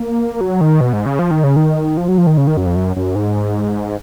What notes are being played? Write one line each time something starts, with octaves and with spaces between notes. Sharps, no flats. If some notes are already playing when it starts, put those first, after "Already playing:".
Already playing: A#3
F#3
D#3
B2
G#2
C#3
F3
D#3
C#3
D#3
F3
F#3
F3
D#3
C#3
D#3
F#2
F2
F#2
F#2
G#2